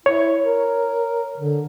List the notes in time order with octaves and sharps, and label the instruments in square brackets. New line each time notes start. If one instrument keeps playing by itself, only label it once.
[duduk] E4 [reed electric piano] C#5
[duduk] A#4
D3